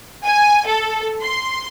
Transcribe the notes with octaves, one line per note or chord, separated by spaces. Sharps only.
G#5
A4
C6